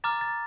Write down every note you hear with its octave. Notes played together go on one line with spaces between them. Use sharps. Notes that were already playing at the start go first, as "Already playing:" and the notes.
A#5 D6 F6 A6
A6